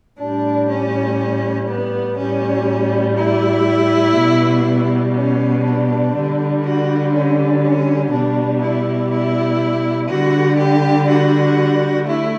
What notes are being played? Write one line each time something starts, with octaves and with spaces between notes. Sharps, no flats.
A2 G3 D4
C#4
B3
A2 G3 C#4
E4
B2 G3
C#4
D4
D3 G3
F#4
C#4
C#4
B2 G3 D4
E4
E4
D3 G3 F#4
G4
F#4
A3 E4